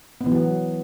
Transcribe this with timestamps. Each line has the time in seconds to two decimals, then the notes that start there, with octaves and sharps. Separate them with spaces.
0.21 B3
0.26 E3
0.32 F#3